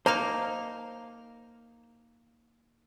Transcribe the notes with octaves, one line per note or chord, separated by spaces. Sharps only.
A#3 D#4 C5 F5 A5 A#5